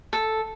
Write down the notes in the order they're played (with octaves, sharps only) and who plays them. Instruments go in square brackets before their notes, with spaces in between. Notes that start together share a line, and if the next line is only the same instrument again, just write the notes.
[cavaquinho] A4